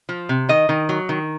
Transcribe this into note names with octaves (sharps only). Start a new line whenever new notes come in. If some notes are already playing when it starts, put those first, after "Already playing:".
F3
C3
D#3 D#5
D#3
F#3
D#3